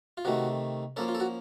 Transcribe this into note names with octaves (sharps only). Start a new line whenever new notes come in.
F4
C3 D#3 A3 F#4
F3 A#3 C#4 A4
F4
A4
F#4